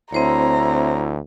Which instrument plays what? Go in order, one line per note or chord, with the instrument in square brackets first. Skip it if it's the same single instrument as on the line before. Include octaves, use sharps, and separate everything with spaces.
[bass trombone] D2 [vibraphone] C4 C5 C#5 [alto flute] E4 [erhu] A#5